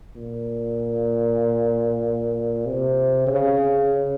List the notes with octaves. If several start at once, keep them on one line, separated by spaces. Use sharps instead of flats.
A#2
C3
C#3